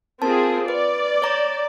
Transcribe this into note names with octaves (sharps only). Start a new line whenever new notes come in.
C4 F4 G#4 A#4 A5
B4 D5
C#5 A#5 A6